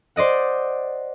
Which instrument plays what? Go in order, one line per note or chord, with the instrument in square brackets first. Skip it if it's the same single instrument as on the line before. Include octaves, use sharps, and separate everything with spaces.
[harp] C5 D5 D#5 F#5